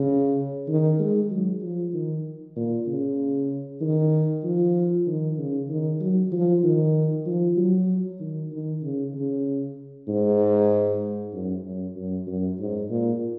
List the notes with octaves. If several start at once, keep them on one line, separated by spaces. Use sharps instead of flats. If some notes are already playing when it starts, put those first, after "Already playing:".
Already playing: C#3
D#3
G#3
F#3
F3
D#3
A#2
C#3
D#3
F3
D#3
C#3
D#3
F#3
F3
D#3
F3
F#3
D#3
D#3
C#3
C#3
G#2
F#2
F#2
F#2
F#2
G#2
A#2